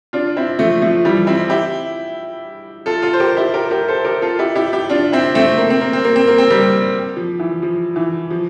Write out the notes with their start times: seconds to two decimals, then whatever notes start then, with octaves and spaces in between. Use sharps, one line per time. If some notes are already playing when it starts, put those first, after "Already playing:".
0.13 D4 F4
0.37 C4 E4
0.59 F3 A3
0.82 F3 A3
1.05 E3 G3
1.27 C4 E4
1.50 E4 G4
2.86 F4 A4
3.02 F4 A4
3.13 C5
3.20 G4 A#4
3.36 E4 G4
3.54 G4 A#4
3.71 G4 A#4
3.88 A4 C5
4.05 G4 A#4
4.22 F4 A4
4.39 E4 G4
4.55 E4 G4
4.73 E4 G4
4.90 D4 F4
5.13 C4 E4
5.35 A3 C4
5.58 A#3
5.70 C4
5.81 A#3
5.93 C4
6.04 A#3
6.16 C4
6.27 A#3
6.38 C4
6.50 G3 A#3
7.16 F3
7.40 E3
7.62 F3
7.96 E3
8.31 F3